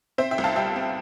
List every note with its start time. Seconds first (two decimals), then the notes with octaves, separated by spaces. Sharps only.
0.18 C4 C5 E5
0.31 E5 G5
0.38 C2
0.44 F5 A5
0.56 G3 E5 G5
0.76 C4